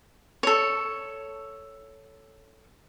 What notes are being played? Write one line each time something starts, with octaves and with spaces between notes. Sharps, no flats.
A4 C#5